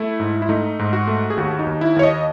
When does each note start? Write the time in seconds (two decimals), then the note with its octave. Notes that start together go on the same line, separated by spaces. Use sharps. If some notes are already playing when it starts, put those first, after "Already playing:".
Already playing: A3 E4
0.20 G#2
0.42 E4
0.49 A3 D#4
0.79 G#2
0.93 F#4
1.07 A3
1.30 G#4
1.37 D#2 F#4
1.59 D#4
1.67 D#2
1.81 E4
1.96 D#2 C#5
2.03 D#5